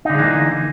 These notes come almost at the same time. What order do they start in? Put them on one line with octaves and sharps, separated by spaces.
D#4 D3 G#3 E3 A#3